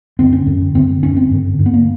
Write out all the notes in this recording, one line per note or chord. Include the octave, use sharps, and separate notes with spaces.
F#2 D3 C4
C#4
F#2 D3
F#2 D3 C4
F#2 D3 C#4
C4
G2 D3
G2 D3
B3
A#3